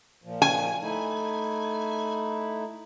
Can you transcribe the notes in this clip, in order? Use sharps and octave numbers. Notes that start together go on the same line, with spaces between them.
A#2 F3
G#5
A3 D#4 E4